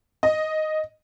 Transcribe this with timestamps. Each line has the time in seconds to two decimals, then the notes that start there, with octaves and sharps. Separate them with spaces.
0.23 D#5